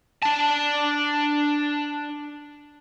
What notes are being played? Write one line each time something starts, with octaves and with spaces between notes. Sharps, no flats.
D4 A5